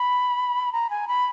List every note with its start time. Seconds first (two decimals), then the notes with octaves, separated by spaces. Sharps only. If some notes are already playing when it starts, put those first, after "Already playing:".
Already playing: B5
0.72 A#5
0.90 G#5
1.08 B5